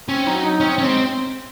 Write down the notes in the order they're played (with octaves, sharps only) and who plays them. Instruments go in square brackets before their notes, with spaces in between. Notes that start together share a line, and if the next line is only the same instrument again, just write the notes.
[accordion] C4 [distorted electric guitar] C#4
[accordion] F#3 [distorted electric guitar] D#4
[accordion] D#4
[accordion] C4 [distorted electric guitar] C#4
[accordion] G#2 [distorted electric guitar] C#4
[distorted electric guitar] C4